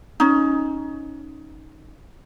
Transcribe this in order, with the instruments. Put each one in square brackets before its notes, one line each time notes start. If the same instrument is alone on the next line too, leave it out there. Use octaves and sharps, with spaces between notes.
[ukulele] C#4 D#4